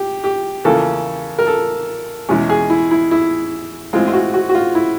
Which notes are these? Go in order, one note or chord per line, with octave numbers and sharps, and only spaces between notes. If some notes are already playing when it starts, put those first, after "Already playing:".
Already playing: G4
G4
E2 C#3 F3 A#3 C#4 A4
A#4
A4
E2 B2 G#3 C#4
G#4
E4
E4
E4
A2 E3 G#3 C4 F4
F4
F#4
F#4
F#4
F4
E4